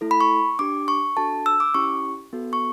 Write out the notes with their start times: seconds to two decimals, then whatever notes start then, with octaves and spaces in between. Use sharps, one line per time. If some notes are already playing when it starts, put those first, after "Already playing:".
0.01 A3 E4 A4
0.11 B5
0.21 C#6
0.59 D4 G4 D6
0.88 C#6
1.16 D4 F#4 A4 A5
1.46 E6
1.60 D6
1.74 C#4 E4 G4 C#6
2.33 B3 F#4 A4
2.53 C#6